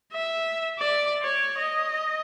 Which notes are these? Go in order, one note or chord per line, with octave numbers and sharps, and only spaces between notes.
E5
D5
C#5
D#5